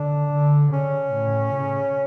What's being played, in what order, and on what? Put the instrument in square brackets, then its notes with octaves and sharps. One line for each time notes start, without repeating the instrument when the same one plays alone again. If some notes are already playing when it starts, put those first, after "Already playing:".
Already playing: [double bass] D3 [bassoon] D4
[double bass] D3
[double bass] C#3 [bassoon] C#4
[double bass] A2
C#3